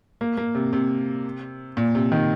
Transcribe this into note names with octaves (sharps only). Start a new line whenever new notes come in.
A#3
A#3
C3
C3
A#2
C3
D#3